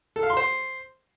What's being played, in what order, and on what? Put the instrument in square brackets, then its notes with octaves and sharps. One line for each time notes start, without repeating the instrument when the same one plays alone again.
[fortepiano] A4
F5
C6
C5